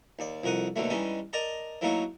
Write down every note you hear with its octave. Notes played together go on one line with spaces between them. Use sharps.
D#2 D5
C2 F2 A#4 F#5 D#6
D#2 B2 D3 F#3 A3
E3 G3 G#3 C#4 D#4
A#4 D5 D#5 A5 A#5
E3 F#3 A3 A#3 D#4 C#5